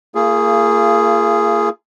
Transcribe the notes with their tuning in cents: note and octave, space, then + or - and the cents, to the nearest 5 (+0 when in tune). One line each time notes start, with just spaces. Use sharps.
A#3 -25 F4 -35 G#4 +0